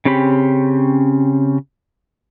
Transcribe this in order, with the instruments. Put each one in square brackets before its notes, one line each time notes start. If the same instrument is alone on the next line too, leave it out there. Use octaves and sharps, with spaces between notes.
[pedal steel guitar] C#3 C4 C#4 G4 B5